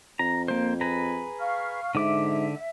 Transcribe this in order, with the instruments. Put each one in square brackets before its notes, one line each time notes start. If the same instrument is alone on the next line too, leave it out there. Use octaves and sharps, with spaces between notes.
[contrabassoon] F2 [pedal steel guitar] A#5
[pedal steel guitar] A#3 C5
G#4 B4 A#5
[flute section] F5 C#6 F6
[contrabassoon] G#2 [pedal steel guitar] D3 D6 [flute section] E5